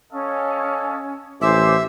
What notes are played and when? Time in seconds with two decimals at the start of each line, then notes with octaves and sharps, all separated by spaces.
0.11 C#4 A4 D#5 F5
1.41 A1 C4 C5 E5 G#5 C6 D6